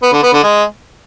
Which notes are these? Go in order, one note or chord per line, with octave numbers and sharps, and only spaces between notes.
B3
D3
B3
D3
G#3